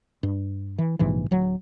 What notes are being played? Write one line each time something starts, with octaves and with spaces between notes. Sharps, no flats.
G2
E3
A#1 G#2 C3 E3
D1 F#3